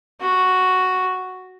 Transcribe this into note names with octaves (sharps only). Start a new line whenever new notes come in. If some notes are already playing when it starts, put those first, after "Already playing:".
F#4